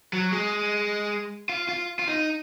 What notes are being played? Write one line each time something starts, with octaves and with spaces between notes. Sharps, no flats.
F#3
G#3
F4
F4
F4
D#4